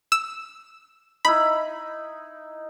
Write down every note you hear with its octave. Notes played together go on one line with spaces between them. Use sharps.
E6
D#4 E4 B5